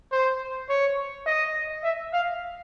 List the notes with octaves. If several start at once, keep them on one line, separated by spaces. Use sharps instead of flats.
C5
C#5
D#5
E5
F5